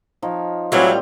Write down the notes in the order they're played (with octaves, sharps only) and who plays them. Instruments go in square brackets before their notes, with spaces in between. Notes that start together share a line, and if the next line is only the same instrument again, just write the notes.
[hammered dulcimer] F3 D#4 C#5
[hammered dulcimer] A2 C4 D5 [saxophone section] E3 F#3 [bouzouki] G3 F4